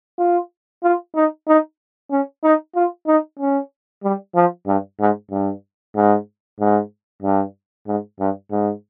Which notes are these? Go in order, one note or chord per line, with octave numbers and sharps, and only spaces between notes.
F4
F4
D#4
D#4
C#4
D#4
F4
D#4
C#4
G3
F3
G2
G#2
G2
G#2
G#2
G2
G#2
G2
G#2